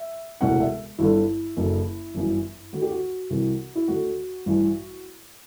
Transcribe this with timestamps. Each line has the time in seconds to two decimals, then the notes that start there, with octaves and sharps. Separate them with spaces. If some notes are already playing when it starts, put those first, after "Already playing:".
Already playing: E5
0.41 E1 D2 C3 E3 F#5
0.60 E5
0.98 G1 G2 D3 E4
1.57 F#1 F#2 D3
2.14 G1 F#2 E3
2.73 D2 D3 F#4
2.82 G4
2.91 F#4
3.30 C2 C3 E3
3.75 E4
3.88 D2 D3 F#4
4.46 A1 G2 E3